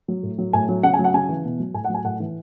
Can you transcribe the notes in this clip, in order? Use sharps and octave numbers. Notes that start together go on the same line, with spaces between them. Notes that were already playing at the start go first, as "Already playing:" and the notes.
F#3
A2
F#3
A2 G#5
F#3
C#3 F#5
G#5
F#3
F#5
C#3 G#5
E3
B2
F#3
A2 G#5
F#5
F#3 G#5
A2 F#5
E3